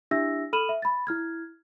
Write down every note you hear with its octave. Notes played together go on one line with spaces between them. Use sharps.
D4 E4 G4 E5 E6 A#6
A4 B5 F6 D#7 E7 F#7
E5
B5 A6
E4 F6 G#6